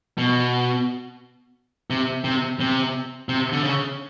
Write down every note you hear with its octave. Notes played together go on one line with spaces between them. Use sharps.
B2
C3
C3
C3
C3
D3
C#3